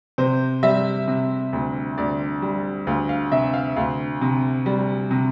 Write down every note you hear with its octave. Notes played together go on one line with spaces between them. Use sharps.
C3 C5
G3 E5
C3
D2
D2 D5
G3
D2 F5
F5
C3 E5
F5
D2 F5
C3
G3
C3